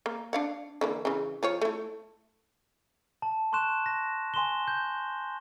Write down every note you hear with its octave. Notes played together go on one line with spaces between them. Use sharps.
A#3
D4 F5 F#5
D3 E3 A#3
C#3 E3
F3 F4 C#5
A3 E4
A5
A5 C6 C#6 F#6 E7
A#6
G#5 C6 E7 G7
G6